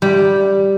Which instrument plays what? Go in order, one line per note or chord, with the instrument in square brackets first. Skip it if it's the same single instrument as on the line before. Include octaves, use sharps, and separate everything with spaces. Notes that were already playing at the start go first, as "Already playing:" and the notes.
[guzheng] G3